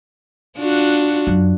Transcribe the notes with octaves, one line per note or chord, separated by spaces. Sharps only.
D4 F4 F#4
F#2